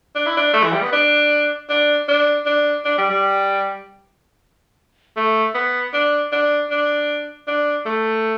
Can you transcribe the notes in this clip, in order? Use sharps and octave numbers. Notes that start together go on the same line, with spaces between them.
D4
E4
D4
A3
E3
G3
B3
D4
D4
D4
D4
D4
G3
G3
A3
B3
D4
D4
D4
D4
A3